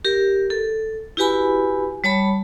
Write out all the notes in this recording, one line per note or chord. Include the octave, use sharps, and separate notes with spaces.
G4 A#4
A4
E4 F#4 G4 B4 G#5 B5
G3 C#5 A5 B5